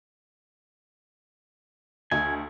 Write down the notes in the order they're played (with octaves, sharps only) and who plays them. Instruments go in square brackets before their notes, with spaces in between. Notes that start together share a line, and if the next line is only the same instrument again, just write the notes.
[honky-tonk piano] D2 [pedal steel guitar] G#5